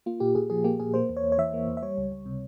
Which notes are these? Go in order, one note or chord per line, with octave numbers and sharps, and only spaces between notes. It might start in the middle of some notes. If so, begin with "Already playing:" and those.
A#3 F4
A#2 G4
A#2 G#4
F3 G#4
A#3 G4
A#2 G#4
A#3 C5
E2
C#5
E2
C#5
E3 E5
A#3
E2
E5
G3 C#5
C#2
C#2
C3